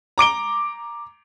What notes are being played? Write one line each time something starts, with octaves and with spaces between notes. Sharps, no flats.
A#5 D6 D7 G7